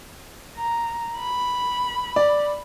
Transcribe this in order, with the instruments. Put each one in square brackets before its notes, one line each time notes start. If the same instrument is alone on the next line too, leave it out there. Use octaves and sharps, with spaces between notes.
[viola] A#5
B5
[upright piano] D5